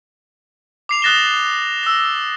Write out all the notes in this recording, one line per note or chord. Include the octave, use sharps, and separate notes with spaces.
D6 C7 F7
D#6 F#6 A6 A#6 E7 G7
E6 A#6